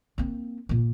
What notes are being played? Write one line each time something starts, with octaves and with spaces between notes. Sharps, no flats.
A#3 C4
A#2 A#3